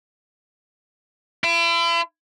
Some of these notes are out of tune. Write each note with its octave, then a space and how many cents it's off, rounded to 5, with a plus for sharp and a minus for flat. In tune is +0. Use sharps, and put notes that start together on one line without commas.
E4 +40